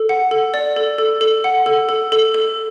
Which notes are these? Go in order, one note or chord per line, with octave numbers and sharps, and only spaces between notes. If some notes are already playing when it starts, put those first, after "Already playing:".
Already playing: A4
F#5
A4
D5
A4
A4
A4
F#5
A4
A4
A4
A4